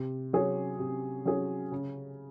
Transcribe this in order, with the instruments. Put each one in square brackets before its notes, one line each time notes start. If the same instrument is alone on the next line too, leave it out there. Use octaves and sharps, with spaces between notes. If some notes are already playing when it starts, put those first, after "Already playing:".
Already playing: [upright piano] C3
F#3 C#4 G#4 C#5
C3
F#3 C#4 G#4 C#5
C#3